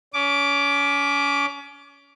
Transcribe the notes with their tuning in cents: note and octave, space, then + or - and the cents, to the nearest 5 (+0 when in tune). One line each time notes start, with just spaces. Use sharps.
C#4 +30 D6 +0